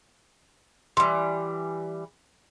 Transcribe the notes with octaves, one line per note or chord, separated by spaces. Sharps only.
E3 G3 C6